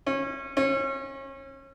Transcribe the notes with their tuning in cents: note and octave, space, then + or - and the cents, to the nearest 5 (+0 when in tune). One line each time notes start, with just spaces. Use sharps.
C#4 -25
C#4 -30